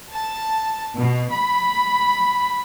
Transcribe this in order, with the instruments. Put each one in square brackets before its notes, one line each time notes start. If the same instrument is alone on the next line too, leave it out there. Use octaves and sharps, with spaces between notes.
[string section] A5
B2
B5